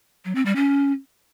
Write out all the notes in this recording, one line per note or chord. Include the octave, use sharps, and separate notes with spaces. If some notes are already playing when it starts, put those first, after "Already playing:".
F#3
C4
G3
C#4